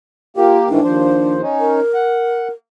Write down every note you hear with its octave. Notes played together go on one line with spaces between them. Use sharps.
A#3 F4 G4
G#2 D#3 E3 D4
D#2 F3 C5
C#4 D#4
A#4
F#5